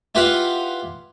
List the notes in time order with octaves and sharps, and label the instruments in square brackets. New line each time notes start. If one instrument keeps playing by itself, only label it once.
[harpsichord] E4 F4 G4 B4 F5 F#5